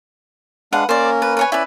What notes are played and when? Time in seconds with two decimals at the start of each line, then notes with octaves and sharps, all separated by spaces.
0.73 G#3 D4 B4 F5 F#5
0.89 A#3 C#4 A#4 C5 D5
1.22 B4
1.37 B4 C#5 G#5
1.52 C#4 E4 B4 D5